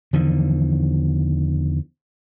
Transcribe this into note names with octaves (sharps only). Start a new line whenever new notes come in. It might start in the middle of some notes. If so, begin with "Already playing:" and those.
E2 D3 D#3 F3